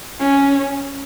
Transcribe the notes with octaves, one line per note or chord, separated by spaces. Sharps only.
C#4